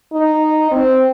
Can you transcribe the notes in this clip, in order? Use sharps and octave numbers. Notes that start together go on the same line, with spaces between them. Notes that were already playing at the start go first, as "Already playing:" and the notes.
D#4
C4